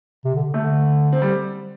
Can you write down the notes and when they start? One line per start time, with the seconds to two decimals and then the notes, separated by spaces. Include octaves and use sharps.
0.25 C3
0.35 D3
0.54 D3 A3
1.13 C4
1.22 G3